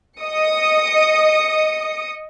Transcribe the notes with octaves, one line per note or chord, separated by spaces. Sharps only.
D#5 D#6 C#7